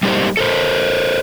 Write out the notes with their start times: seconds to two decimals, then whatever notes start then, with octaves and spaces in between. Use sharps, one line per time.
0.03 G3 G#3 A#3 D#4 G4 C5
0.37 A4 A#4 C5